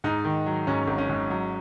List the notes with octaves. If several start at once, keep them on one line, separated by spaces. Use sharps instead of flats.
G#2 D#4
D#3
F#3
G#2 C#4
G#1
C#4
G#2
F#3